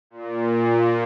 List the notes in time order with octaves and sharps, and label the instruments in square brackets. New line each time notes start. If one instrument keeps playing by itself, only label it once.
[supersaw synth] A#2